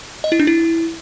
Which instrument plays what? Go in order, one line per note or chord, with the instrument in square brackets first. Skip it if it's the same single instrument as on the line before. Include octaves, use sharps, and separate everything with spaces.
[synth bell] D#5
E4
D4
E4